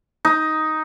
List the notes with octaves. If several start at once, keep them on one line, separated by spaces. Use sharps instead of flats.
D#4